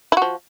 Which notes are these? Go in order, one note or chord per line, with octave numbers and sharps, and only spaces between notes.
F3 E4 F#4